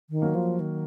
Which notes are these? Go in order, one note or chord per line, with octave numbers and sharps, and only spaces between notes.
D#3
F#3 A#3
F3
D#3